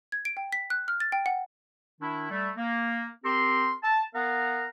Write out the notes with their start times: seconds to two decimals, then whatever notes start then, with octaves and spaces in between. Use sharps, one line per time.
0.12 G#6
0.25 D7
0.37 G5
0.53 B6
0.70 F#6
0.88 F6
1.00 A6
1.12 G5
1.26 F#5
2.01 D#3 D4 E4
2.31 G3 A3
2.57 A#3
3.24 C4 G4 A#4 C6
3.84 A5
4.15 B3 A#4 F5 F#5 A#5